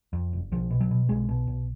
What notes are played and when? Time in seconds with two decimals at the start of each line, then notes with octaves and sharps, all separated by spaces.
0.13 F2
0.33 F#1
0.52 B1 F3
0.70 B2
0.81 F#3
0.91 B2
1.09 B1 G#3
1.28 B2
1.47 B1